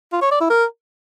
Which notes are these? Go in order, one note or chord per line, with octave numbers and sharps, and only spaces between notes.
F4
C#5
D5
E4
A#4